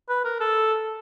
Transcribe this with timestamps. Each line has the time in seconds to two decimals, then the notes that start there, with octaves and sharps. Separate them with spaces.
0.09 B4
0.25 A#4
0.40 A4